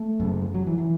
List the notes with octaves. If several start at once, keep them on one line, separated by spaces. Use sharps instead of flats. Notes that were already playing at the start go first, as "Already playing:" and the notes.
Already playing: A3
F#2 C#3
F#3
E3
E3